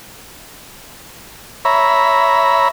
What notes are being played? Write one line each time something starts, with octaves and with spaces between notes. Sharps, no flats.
C#5 E5 A#5 B5